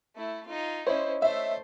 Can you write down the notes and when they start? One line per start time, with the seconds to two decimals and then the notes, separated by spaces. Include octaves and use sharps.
0.16 A3 E4
0.46 D#4 F4
0.87 C#4 E4 C5 C#5 D#5
1.22 A3 C5 E5